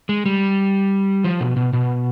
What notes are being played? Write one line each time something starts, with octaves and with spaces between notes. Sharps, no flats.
G#3
G3
F3
B2
B2
B2